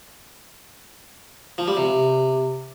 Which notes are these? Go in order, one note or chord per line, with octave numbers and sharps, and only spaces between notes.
F3
G3
C3